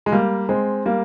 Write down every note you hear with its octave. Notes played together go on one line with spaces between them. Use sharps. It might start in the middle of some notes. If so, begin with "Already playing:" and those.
G#3
G3 A#3
G#3 C4
G3 A#3